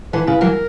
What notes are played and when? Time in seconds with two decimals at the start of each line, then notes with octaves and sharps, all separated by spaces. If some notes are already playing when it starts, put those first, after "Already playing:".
0.13 D3 E3 B4
0.27 C#3 B4
0.41 E3 F#3 A#4